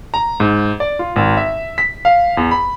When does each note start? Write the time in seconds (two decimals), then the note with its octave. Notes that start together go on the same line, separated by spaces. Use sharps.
0.14 A#5
0.40 G#2
0.80 D5
0.99 F4
1.16 G#1
1.37 E5
1.78 B6
2.05 F5
2.37 E2
2.51 B5